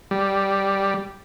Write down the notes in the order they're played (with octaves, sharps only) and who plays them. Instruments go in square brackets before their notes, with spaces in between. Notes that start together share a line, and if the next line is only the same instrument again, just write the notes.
[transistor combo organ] G3